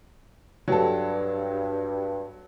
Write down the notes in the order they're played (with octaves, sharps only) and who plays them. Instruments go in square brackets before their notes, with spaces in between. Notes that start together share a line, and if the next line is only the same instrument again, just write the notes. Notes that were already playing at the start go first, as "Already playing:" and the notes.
[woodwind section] G2 [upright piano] F#3 A4